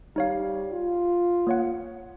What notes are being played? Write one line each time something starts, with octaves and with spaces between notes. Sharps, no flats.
G3 D#4 C#5 F5
F4
A#3 C#5 F#5